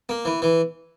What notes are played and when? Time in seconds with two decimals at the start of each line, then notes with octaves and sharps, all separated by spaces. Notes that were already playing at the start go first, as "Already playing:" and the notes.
0.09 A#3
0.25 E3
0.42 E3